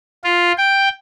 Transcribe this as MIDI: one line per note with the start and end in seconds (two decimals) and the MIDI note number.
0.24 0.52 65
0.58 0.89 79